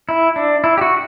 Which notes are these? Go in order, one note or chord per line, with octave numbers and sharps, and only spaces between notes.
E4
D4
E4
G4
F#4